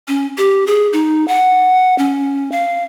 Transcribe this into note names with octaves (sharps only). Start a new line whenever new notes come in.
C#4
G4
G#4
D#4
F#5
C#4
F5